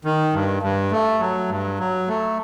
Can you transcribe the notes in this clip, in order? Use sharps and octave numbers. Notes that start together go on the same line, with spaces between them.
D#3
G2
G2
A3
F#3
G2
F#3
A3